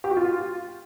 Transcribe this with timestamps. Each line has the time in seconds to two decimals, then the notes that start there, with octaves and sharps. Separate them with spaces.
0.04 G4
0.10 F#4
0.17 F4